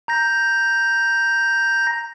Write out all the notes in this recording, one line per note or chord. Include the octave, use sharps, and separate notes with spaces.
A#5 G6 A#6